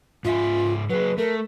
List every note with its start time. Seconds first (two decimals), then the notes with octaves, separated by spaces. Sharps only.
0.24 G#2 F4 E5 G#5
0.90 F#3 G#4 B4
1.18 A3 A#4